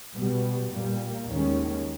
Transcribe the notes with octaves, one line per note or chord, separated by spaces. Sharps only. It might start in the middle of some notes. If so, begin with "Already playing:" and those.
B2 G3 B3
A#2 G3 A#3
D#2 D#3 G#3 C#4